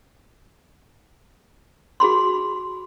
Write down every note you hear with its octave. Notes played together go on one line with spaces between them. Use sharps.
F#4 G#4 B5 C6